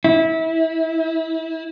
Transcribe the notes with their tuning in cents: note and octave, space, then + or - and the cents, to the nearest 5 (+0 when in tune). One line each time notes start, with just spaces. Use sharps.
E4 -25